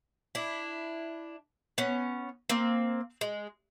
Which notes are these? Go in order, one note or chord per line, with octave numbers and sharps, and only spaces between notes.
D4 E4
B3 C#4
A#3 C4
G#3